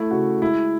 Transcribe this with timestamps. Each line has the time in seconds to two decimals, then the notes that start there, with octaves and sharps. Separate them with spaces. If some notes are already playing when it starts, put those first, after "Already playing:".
Already playing: A3 E4
0.11 C#3 F#4
0.42 G#3 E4